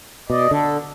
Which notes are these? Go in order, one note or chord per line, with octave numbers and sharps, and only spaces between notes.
B2 D5 D#5
D3 A4